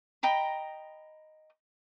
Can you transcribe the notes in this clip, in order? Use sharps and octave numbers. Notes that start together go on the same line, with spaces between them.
D#5 G5 A#5 B5